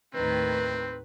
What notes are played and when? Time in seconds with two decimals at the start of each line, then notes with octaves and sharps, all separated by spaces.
0.14 D#2 A2 D#3 C4 B4